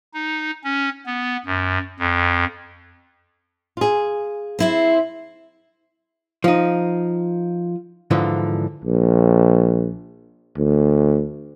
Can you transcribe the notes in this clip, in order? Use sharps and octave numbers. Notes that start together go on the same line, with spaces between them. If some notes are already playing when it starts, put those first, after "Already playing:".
D#4
C#4
B3
F#2
F2
F4 G#4
C4 E4 C5
F3 D#4
G#2 D3 E3 F3
A#1
D2